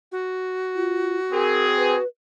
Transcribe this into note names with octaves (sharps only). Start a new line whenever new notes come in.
F#4
F4
C4 G#4 A#4
B4